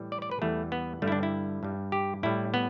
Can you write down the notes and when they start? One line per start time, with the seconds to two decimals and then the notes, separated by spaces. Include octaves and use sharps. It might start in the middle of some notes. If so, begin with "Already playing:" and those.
Already playing: A2 E3 G3
0.12 D5
0.22 D5
0.31 B4
0.42 E2 E3 G3 A3
0.72 B3
1.02 G2 D3 G3 A3
1.08 E4
1.12 D4
1.23 E4
1.63 G2 G3
1.92 G4
2.23 A2 G3 E4
2.54 B3